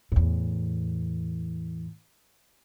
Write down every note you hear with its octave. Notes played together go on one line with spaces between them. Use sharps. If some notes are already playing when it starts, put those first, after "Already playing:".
E2 A2